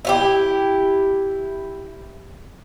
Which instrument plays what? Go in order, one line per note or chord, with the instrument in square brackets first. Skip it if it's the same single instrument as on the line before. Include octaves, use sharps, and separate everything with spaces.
[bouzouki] E4 F4 G4